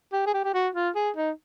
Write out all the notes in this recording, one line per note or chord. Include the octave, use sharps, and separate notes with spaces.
G4
G#4
G4
G4
F#4
F4
G#4
D#4